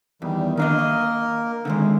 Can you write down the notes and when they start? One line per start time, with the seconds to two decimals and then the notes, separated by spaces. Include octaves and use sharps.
0.22 E2 D#3 G3
0.57 D#3 A#3 D4 A#4 D#5
0.79 D#5
1.65 D3 D#3 G#3